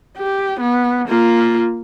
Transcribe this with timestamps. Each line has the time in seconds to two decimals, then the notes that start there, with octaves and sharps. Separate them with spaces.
0.17 G4
0.60 B3
1.08 A#3 F4